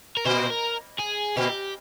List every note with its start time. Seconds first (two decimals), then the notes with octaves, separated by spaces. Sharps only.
0.17 A#4
0.25 A#2 C5
0.50 A#4
0.99 G#4
1.37 A#2 G4